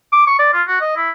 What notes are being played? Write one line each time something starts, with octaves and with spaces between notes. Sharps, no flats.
D6
C#6
D5
F4
F#4
D#5
E4